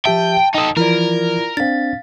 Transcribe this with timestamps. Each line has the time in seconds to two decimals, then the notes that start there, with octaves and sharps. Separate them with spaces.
0.05 F3 G4 E5 G5 A5
0.54 D#4 A4 G5 D#6
0.77 E3 F3 E4 F4 A#4 D5
1.57 C4 D4 F5 A6